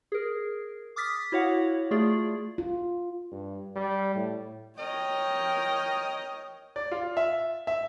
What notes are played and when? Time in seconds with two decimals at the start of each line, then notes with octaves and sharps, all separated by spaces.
0.12 G#4 A#4
0.96 D6 D#6 F6 A6 B6
1.32 E4 F#4 C#5 F5 F#5
1.91 A3 F4 G#4 D5
2.58 F4
3.31 G2
3.76 G3
4.15 A2
4.78 A#4 C#5 D#5 G5
6.76 D5
6.91 F4
7.17 E5
7.67 E5